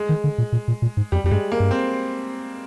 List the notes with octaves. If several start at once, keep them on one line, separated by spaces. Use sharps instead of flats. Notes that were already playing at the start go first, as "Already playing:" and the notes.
Already playing: G#3
D#3
D3
A#2
A#2
A#2
A#2
G#2
F2 G3
F2 G3
G2 G#3
A#3
G2
C4